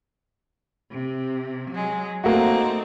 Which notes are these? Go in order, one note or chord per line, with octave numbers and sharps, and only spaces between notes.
C3
F#3 G#3
A3 A#3 C4 D#4 F#4